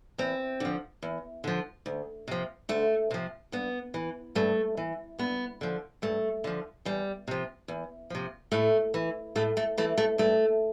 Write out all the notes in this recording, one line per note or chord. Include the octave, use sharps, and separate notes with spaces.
E2 C4
D3 F3
E2
D3 F3
D2
C3 F3
D2 A3
C3 F3
G2 B3
E3
G2 A3
E3
G2 B3
D3 F3
G2 A3
D3 F3
E2 G3
C3 F3
E2
C3 F3
A2 A3
E3
A2 A3
A3
E3 A3
A3
G2 A3